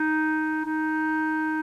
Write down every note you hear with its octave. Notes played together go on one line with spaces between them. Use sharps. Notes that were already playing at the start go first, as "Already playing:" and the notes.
Already playing: D#4
D#4